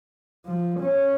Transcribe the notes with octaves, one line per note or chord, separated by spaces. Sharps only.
F3
C#4